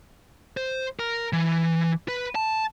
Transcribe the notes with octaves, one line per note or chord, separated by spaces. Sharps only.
C5
A#4
E3
B4
A5